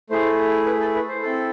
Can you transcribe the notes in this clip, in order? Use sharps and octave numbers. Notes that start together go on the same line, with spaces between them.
A3 E4 G#4 C5
B4
A4
B4
C5
C4 E4 A4